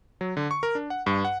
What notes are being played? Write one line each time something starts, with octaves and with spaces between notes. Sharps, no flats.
F#3
D3
C#6
A#4
D4
F#5
G2
F#5